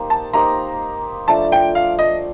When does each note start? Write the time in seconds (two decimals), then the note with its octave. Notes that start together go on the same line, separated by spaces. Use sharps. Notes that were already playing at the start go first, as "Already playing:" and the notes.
Already playing: A#3 D#4 G4 C5
0.10 A5
0.33 A#3 D#4 G4 C5 A#5
1.28 F3 A3 D4 A5
1.52 G5
1.75 F5
1.99 D#5